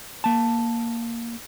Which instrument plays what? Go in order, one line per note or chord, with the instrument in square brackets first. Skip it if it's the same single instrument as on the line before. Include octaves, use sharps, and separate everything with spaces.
[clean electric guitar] A#3 A5